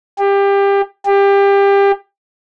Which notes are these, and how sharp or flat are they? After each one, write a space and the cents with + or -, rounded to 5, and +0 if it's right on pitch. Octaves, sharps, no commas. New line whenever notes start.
G4 +25
G4 +25